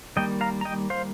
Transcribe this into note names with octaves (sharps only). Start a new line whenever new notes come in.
D#3 G3 A#3 D#5 G5
F5 A#5
A#5
D#5 G5
C5 F5